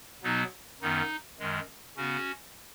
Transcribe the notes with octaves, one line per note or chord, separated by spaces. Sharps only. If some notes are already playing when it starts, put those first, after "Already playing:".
B2 F#3 B3 D#4
F#2 D#3 B3 D#4
F#2 D#3 G#3
C#3 B3 C#4 F#4